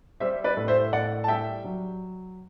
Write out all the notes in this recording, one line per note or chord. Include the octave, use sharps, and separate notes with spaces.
G3 C5 E5
B4 D5
A2
C5 E5
A2 D5 F#5
A5
G3 E5 G5
F#3